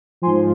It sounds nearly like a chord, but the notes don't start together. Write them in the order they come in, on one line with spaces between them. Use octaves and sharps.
F3 G#5 C6 G#2